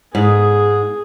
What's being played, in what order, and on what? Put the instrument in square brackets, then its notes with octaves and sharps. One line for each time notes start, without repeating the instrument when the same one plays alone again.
[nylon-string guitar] G#2 [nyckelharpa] G#4